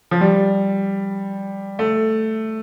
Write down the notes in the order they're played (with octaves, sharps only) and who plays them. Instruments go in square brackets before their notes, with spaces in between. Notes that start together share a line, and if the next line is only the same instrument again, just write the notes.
[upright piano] F3
G3
A3